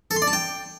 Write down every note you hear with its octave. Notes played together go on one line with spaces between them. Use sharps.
A4
C6
D5
A5
G5